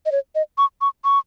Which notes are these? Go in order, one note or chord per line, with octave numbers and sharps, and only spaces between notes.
D#5
C#5
D#5
C#6
C#6
C#6